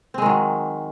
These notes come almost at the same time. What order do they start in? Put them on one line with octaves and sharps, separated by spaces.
C4 G#3 D#3 F#3